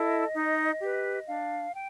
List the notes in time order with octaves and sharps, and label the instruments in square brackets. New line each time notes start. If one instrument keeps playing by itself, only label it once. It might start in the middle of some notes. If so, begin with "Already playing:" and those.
Already playing: [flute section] E4 A4 D#5
D#4
G4 B4
D4 F5
G5